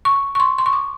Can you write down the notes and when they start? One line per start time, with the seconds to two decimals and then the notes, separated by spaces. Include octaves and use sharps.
0.05 C#6
0.35 C#6
0.40 C6
0.58 C6
0.66 C#6
0.73 D6